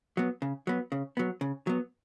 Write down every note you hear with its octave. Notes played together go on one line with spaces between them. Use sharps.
F#3 B3
C#3
F#3 B3
C#3
F#3 B3
C#3
F#3 B3